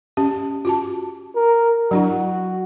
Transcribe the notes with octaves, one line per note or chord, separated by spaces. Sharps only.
C#4 G4
F4 F#4 A5
A#4
F#3 D4 E4 F#4